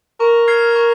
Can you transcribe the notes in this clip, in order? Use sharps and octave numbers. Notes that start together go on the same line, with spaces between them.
A#4 C#6
F6 G#6 C7
C#6